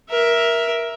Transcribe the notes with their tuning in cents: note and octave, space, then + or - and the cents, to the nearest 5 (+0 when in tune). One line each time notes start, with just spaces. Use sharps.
A#4 +15 E5 +0